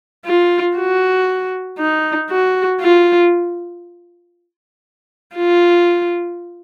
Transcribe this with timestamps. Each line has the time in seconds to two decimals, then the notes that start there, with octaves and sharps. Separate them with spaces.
0.25 F4
0.76 F#4
1.78 D#4
2.30 F#4
2.81 F4
5.35 F4